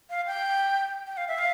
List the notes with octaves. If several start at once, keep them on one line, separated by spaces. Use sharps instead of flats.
F5
G5
G5
F5
E5
F5